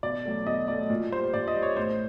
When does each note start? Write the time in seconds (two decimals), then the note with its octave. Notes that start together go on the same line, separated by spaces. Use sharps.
0.03 B2 D5
0.25 F#3 A3
0.46 B2 D#5
0.68 F#3 A3 D5
0.90 A#2
1.12 G3 C5
1.34 A#2 D5
1.48 D#5
1.56 G3
1.63 C#5
1.77 A2 C5